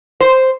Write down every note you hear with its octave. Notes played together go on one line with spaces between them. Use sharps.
C5